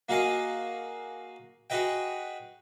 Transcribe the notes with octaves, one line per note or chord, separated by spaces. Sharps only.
A#3 F#4 G#4 D#5 F5 G#5
F#4 G#4 B4 D#5 G5